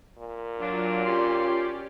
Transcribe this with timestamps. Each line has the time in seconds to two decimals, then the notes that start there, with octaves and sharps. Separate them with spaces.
0.18 A#2
0.59 F#3 D4 F4
1.05 C#4 F4 G4 D5 C6